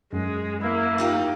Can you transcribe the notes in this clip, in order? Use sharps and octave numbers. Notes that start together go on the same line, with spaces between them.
F#2 G#3
A#3 E4
D#4 F4 G4